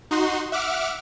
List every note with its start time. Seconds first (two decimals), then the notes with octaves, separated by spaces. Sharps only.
0.11 D#4 F#4 C6
0.52 E5 F#5 D6 F6